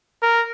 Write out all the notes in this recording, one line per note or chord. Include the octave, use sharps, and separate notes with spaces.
A#4